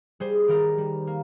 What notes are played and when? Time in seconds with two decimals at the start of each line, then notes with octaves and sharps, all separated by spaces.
0.20 G3 G#4 C5
0.48 D#3 G4 A#4
0.78 G3
1.07 A#3